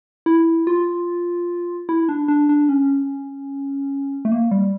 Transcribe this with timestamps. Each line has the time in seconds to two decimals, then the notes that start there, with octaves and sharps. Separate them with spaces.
0.26 E4
0.67 F4
1.89 E4
2.09 D4
2.28 D4
2.49 D4
2.69 C#4
4.25 A3
4.31 A#3
4.51 G3